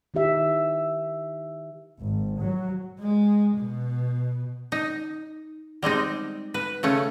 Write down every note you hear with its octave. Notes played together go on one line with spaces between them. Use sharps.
D#3 D#4 G4 E5
G#1
F#3
G#3
B2
D#4
G3 G#3 C4 D#4
B4
C#3 A3 C#4